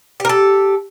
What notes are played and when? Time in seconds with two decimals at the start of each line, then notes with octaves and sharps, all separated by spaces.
0.20 G4
0.25 A#4
0.29 A4